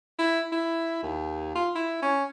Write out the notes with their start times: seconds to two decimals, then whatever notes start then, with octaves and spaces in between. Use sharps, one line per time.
0.19 E4
0.52 E4
1.03 D#2
1.55 F4
1.75 E4
2.03 C#4